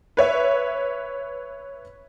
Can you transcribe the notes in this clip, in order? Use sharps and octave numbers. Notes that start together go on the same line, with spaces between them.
B4 C#5 E5